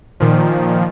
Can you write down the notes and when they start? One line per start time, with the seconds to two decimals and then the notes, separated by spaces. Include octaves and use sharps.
0.20 A#2 D#3 F3